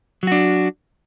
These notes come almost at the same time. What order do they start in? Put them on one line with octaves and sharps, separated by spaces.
F#3 F#4 D4